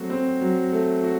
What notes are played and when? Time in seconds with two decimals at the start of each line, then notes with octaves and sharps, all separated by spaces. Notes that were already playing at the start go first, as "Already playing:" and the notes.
Already playing: F#3 A3 C4 F#4
0.10 C4
0.41 F#3
0.72 A3
1.04 F#4